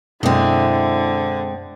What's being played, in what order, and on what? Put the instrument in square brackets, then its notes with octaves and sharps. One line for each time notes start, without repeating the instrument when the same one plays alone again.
[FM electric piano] F#2 B2 [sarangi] D3 [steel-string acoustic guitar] G#3 C4 [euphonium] E4